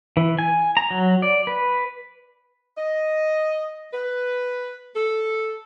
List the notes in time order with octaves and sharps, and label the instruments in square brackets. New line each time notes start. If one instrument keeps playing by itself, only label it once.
[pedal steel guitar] E3
G#5
A#5
F#3
D5
B4
[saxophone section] D#5
B4
A4